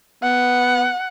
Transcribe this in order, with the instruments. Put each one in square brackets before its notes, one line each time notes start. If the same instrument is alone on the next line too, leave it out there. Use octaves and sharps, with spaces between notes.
[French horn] B3 [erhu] F#5